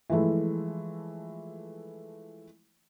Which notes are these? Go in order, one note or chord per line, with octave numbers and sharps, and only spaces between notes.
E3 F3 G#3 A3 E4